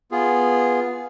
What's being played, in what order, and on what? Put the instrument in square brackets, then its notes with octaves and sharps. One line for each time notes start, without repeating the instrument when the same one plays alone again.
[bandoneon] B3 F4 G#4